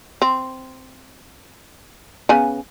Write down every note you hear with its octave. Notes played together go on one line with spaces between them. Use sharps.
C4
C#3 B3 G#5